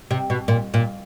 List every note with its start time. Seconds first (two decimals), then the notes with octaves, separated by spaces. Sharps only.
0.11 C3
0.30 B2
0.48 A#2
0.74 A#2